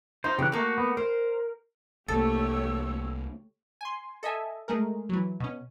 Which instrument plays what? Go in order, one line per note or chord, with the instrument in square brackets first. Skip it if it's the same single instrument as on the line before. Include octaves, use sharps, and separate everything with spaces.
[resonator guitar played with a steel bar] D#4 F4 [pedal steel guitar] C5
[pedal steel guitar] C#3 E3 F#6 [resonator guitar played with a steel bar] G4
[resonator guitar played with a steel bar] A3 A#3 [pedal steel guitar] F#4
[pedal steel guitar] B3
[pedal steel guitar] A#4 [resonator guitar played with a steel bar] C5
[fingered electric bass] C2 A#3 [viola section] A3 G4 C#5 [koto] A4 [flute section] E6
[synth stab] G#5 C6
A4 D#5 E5 G#5
G#3 A3 G#4 A#4
E3 F#3
B2 C#4